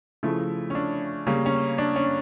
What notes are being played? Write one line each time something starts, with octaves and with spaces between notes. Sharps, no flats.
C#3 F3 A3 E4
C#4
D4
C#3 G3 A#3 C#4
C#4
D4
C#4